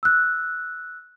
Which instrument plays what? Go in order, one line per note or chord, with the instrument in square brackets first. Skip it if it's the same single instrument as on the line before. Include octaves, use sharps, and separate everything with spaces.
[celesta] E6 F#6